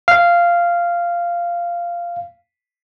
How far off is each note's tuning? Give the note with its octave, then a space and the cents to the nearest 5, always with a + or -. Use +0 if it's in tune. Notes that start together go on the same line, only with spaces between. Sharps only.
F5 -10